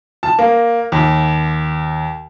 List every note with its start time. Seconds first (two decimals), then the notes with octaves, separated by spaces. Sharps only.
0.23 A5
0.39 A#3
0.92 D#2